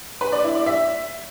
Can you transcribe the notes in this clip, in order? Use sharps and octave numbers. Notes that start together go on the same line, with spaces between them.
B4
D5
E4
D5
E5